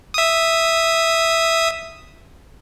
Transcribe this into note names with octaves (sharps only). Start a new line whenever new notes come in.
E5 D#6